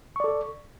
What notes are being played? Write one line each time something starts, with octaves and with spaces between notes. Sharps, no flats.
A4 D5 C#6